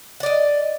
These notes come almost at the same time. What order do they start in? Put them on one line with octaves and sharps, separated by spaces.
F#5 D5 D#5